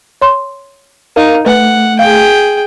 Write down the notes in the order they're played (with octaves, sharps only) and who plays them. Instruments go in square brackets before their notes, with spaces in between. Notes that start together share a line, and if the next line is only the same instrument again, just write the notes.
[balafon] C#5 C6
[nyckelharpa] D#4 [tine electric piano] A#4 F5
[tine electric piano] A3 [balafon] B4 G#5 [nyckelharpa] F#5
[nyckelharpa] G#4 G5 [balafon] F5